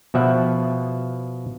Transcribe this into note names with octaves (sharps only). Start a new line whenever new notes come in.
B2 F3 E5 F#5